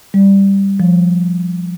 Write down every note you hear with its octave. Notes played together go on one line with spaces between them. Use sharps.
G3
F3